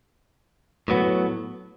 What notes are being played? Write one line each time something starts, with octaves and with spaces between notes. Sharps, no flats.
A2 F#3 B3